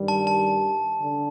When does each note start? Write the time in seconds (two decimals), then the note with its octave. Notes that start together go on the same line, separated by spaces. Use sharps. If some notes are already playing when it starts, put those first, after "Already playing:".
Already playing: G2 D#3 G3
0.08 A5
0.27 A5
1.00 D3